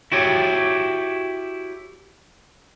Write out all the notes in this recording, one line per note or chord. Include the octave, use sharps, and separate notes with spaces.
E4 F#4 G4 C#5